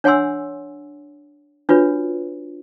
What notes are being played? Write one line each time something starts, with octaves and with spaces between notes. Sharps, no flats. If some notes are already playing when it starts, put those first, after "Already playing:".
D4 C#5 F#5 G#5 C6 E6
D4 F4 F#4 B4 C#5